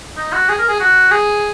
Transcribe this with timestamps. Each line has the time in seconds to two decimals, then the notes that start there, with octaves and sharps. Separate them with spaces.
0.17 D#4
0.33 F#4
0.49 G#4
0.59 A#4
0.69 G#4
0.80 F#4
1.11 G#4